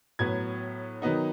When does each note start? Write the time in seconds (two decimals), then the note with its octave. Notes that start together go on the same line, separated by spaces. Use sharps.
0.19 A2 F#3 B3 G#6
1.02 D#3 F#3 B3 D#4